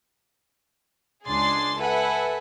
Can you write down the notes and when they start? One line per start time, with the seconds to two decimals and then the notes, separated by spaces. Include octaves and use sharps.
1.27 C#2 D4 G#4 C6 A6 C7
1.80 A4 B4 E5 F#5 G#5